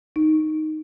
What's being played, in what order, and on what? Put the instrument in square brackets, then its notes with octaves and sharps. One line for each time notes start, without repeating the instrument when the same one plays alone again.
[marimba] D#4